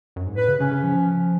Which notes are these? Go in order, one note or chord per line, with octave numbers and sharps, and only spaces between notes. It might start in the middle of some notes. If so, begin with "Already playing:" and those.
F#2
G#2
A2 B4
C#3
C#3 C#4
C#3
F3